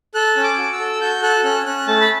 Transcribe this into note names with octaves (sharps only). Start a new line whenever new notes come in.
A4 F#6
C#4
D6
F#4
E6
A4
F#4 G6
A4 F#6
C#4 F#6
C#4 F#6
A3 A5
B5